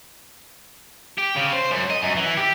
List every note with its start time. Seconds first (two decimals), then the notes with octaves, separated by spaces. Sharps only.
1.18 G4
1.37 C#3
1.53 C5
1.72 F#2
1.90 D#5
2.02 F#2
2.17 E3
2.37 G4